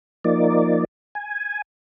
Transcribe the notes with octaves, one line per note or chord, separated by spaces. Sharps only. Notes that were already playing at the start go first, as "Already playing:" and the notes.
F3 A#3 D#4 D5
G#5